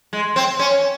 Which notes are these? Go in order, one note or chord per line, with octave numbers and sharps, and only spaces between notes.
G#3
C4
C#4